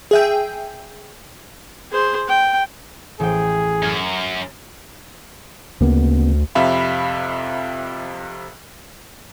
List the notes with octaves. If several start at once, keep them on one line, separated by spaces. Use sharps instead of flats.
G#4 E5 G5
G#4 C5
G5
A1 G#4 G5
F#2 A#5 F6 G#6
D2 C#3 A#3 B3
F2 C3 E5 F5 B5